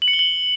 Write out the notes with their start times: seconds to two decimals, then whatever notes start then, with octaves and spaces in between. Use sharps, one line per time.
0.02 F#7
0.08 C#7
0.13 G7
0.19 F#7